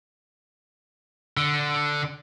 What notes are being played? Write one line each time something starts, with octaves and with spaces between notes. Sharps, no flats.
D3